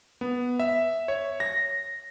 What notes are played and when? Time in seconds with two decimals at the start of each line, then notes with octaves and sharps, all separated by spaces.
0.21 B3
0.59 E5
1.08 C#5
1.40 A#6